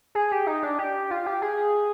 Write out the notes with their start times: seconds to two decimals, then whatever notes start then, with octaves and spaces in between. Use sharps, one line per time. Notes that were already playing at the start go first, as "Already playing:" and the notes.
0.15 G#4
0.32 G4
0.47 D#4
0.63 D4
0.79 G4
1.11 F4
1.26 G4
1.42 G#4